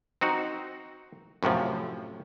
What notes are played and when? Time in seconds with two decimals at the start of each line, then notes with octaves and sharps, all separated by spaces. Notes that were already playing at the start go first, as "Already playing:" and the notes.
0.21 C4 D#4 F#4
1.43 F#2 A2 C3 F3